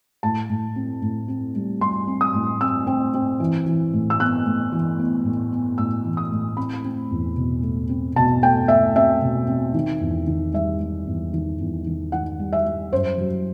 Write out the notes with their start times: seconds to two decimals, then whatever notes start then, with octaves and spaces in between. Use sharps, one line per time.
0.23 A2 A5
0.50 A2
0.76 C4
1.02 A2
1.28 C4
1.55 G3
1.81 G3 C6
2.07 C4
2.21 D#6
2.34 A2
2.61 C4 E6
2.87 C4
3.14 C4
3.40 E3
3.66 E3
3.93 A2
4.10 E6
4.20 B3 F#6
4.45 A2
4.72 E3
4.99 B3
5.25 A2
5.52 B3
5.78 A2 E6
6.04 E3
6.17 D#6
6.32 A2
6.57 C4 B5
6.84 C4
7.11 E2
7.36 B2
7.63 A3
7.89 C4
8.16 B2 A5
8.42 A3 G5
8.68 A3 E5
8.95 C4 E5
9.22 B2
9.48 C4
9.74 D#3
10.01 E2
10.27 D#3
10.53 G3 E5
10.80 G3
11.07 E2
11.33 D#3
11.60 E2
11.87 D#3
12.12 D#3 F#5
12.39 G3
12.53 E5
12.66 G3
12.93 F#2 C5
13.18 F#3